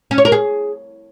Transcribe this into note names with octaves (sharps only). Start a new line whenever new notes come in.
C#4
C#5
A#4
G#4